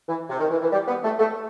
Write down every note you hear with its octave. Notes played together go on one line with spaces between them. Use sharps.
E3
C3
D#3
E3
E3
G3
B3
A3
A3